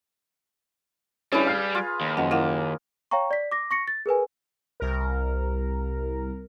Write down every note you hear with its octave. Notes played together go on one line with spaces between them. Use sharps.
G3 C#4 D4 E4 G#4 B4
F5 F6 C7
F4
D#2
F#2 F3 D#5 F#5
A#3 E4 F5 F#5
C#5 F5 G5 A#5 C#6
D5 B6
D6 A#6
C#6 A#6 C#7
A6
G#4 A#4 B4 G#5
C2 A#4